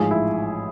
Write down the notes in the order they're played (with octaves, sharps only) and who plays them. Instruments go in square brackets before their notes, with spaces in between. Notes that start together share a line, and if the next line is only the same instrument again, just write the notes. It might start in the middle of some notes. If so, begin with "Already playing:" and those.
Already playing: [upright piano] A1 G#2 F3 G#4
E4